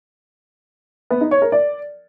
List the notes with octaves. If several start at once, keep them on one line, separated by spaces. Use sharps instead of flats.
B3
D#4
C#5
A#4
D5